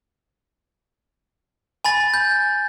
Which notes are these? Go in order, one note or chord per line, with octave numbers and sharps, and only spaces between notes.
G#5 B5 A6
G6